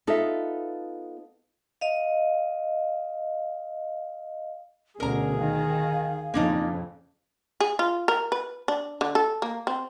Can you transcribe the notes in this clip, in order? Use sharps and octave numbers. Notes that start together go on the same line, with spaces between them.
B3 D#4 F4 A4 E5
D#5 F5
D2 B2 D3 C#4 G#4 A#4 A#5
D#3 F5
F2 C#3 A#3 D4 D#4
G#4
F4
A#4
B4
D4
D3
A4
A#3
C4